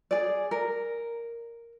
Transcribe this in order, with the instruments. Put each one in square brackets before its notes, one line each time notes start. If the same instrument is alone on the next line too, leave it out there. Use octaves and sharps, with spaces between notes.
[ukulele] G#4 D5
A#4